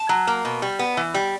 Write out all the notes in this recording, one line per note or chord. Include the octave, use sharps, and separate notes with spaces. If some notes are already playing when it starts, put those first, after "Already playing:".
Already playing: A5
F#3
A#3
B2
G3
B3
E3
G3